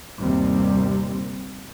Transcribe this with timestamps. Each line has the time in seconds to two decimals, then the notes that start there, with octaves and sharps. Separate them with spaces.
0.20 G1 D#2 C3 D#3 G3 C4